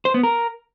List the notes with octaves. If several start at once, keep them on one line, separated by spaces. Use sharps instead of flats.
C5
B3
A#4